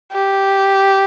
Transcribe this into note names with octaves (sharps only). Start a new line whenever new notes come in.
G4